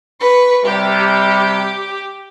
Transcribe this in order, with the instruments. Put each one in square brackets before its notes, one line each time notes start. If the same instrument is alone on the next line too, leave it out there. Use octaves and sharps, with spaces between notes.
[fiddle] B4 C#6
[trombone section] C3 G3 [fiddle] G4